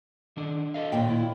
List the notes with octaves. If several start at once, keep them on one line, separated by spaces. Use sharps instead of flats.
D#3 D4
A4 D#5 F5
D#2 A#2 G5
E4